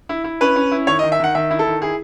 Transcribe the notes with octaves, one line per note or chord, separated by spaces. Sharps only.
E4
E4
C#4 B4
C#4
E4
D#3 C#5
D#5
D#3
E5
D#3 F#5
D#3 E5
E4
A4
D#3
E4 G#4